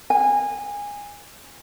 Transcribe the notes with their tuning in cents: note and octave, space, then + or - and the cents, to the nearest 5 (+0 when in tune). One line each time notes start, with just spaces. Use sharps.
G#5 -20